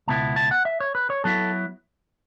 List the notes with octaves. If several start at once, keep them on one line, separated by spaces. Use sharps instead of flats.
C#2 B2 B3 E4 A5
A5
F#5
E5
C#5
B4
C#5
F#3 B3 E4 A4